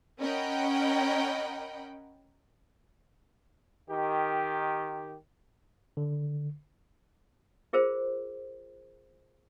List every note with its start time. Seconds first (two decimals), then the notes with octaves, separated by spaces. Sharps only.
0.20 C#4 A#4 D#5 F#5 G5 B5
3.89 D#3 G4
5.97 D3
7.73 F4 G#4 A#4 C5